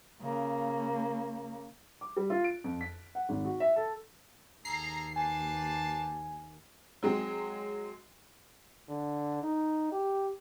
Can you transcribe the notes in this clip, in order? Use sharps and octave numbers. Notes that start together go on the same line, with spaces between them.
C#3 A#3
D6
G3
F4
D7
F2
B6
F#5
G#1
F#4
E5
A4
D#2 G#4 A4 A#5 C7
G4 B4 G#5 A5
F#3 G#3 C4
D3
D#4
G4